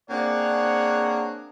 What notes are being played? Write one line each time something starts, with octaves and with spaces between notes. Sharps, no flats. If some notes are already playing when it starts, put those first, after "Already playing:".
A#3 C4 D4 G#4 C#5 F#5